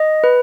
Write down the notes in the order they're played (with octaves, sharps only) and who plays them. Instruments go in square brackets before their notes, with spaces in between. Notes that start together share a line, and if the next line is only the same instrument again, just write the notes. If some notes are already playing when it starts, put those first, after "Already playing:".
Already playing: [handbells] D#5
B4